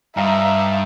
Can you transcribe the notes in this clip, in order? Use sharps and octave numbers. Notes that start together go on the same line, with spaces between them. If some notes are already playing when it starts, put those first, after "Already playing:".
G2 D#4 E5 F5 A#5